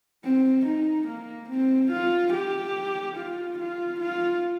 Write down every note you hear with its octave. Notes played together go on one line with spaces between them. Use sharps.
C4
D#4
A#3
C4
F4
G4
F4
F4
F4